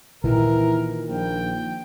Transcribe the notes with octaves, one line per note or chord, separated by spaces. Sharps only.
A#2 D#3 E3 A#4
A#1 G5